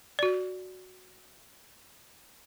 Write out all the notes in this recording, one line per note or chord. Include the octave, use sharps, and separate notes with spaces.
F#4 D5